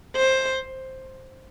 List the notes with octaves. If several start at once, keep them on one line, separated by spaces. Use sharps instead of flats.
C5